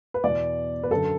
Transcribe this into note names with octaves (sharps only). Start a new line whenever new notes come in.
B4
E2 B2 D5
B4
F#2 D3 A4